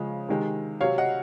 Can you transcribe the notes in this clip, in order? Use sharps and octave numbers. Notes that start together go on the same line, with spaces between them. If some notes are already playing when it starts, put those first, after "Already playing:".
Already playing: C#3 F3 G#3
C3 D#3 G#3
C3 F#3 C#5 F5
D#5 F#5